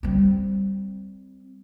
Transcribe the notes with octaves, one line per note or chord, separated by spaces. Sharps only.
G3 C4